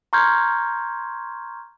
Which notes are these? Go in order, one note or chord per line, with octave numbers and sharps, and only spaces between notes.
A#5 C6 C#6 F6 G6 G#6